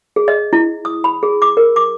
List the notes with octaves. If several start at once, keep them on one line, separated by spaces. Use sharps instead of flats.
G#4
D#5
E4
D#6
B5
G#4
D6
A#4
D6